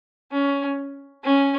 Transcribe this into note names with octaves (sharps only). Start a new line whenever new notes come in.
C#4
C#4